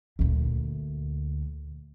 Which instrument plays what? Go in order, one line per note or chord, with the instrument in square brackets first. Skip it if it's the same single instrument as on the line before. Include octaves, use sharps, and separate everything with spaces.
[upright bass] D2 A#2